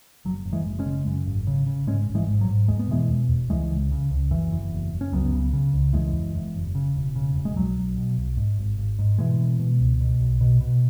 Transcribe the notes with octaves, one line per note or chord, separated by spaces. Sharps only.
F#1 F#3
F#1
E3 G#3
F#1
G#3 C#4
C#3
F#2
G#1
C#3
C#3
G#2 G#3 C#4
G#1
E3 G#3
G#2
F#3
G#2
E2 G#3
B3
B2 E3 G#3
E2
E1
C#2 E3 G#3
C#2
C#3
C#2
F#1 E3
E2
F#1
F#1
C#4
C#2 F#3 B3
C#3
C#3
C#2
E2 E3 G#3
F#1
E2
F#1
C#3
E1
C#3
E1
G#3
B1 F#3
B1
B2
B1
G#2
G#1
G#1
G#2
B2 E3 G#3
B2
B2
C#2
B2
B1
B2
B2